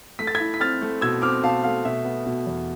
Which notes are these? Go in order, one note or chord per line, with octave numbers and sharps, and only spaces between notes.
A3 B6
A6
G#6 B6
E4
B6
C4 F6 A6
A3
B2 E6 G#6
C4 D6 F6
B2 F5 A5
A3 F5
B2 E5
B3
B2
E2